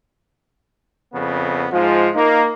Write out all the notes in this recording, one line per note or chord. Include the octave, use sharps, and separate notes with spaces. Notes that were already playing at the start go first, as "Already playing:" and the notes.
F2 C#3 B3
G#2 F3 G#3 F4
A#3 D#4